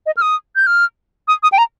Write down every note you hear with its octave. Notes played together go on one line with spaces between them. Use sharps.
D#5
F6
D#6
G6
F6
D#6
D#6
G5
A#5